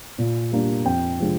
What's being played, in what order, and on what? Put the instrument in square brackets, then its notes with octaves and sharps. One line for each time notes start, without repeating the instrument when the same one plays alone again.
[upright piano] A#2
G3 A#3 D4
F2 G5
C3 F3 G#3 D4